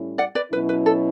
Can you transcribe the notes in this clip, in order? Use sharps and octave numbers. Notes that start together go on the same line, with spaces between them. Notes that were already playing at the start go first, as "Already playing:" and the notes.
Already playing: A2 G3 C#4 E4
D5 F#5
B4 D5
B2 F#3 C#4 E4 B4
B4
A4